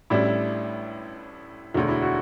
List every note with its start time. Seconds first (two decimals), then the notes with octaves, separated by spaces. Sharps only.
0.10 A1 A2 G3 D4 E4
1.74 E1 D2 D3 F#4
1.89 E4
2.02 F#4